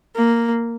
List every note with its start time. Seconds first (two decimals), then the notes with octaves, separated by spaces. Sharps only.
0.16 A#3